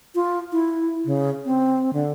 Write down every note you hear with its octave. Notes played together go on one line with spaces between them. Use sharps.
F4
E4
C#3
C4
D3